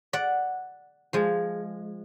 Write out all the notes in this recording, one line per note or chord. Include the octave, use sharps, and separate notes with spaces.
D5 F#5
F3 G#3